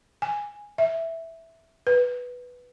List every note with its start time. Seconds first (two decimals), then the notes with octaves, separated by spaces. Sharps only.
0.22 G#5
0.78 E5
1.87 B4